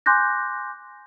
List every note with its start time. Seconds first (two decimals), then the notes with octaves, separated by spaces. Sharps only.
0.06 G#5 C6 D6 F#6 G6 A#6